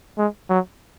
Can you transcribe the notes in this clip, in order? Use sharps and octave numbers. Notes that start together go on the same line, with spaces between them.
G#3
F#3